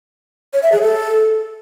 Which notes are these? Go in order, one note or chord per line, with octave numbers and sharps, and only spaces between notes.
C#5
E5
G#4
A4